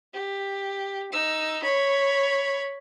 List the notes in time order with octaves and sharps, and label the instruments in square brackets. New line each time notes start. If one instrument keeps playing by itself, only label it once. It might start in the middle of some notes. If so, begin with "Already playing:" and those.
[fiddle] G4
D#4 E6
C#5 B5